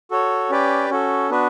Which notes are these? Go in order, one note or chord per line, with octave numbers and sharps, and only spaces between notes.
F#4 A4 C#5
C#4 G4 B4 D5 G5
C#4 F#4 A4
B3 D4 F#4 B4